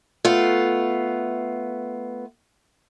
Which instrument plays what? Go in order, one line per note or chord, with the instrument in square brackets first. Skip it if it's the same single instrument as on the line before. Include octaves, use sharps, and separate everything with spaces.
[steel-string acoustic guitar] A3 B3 F4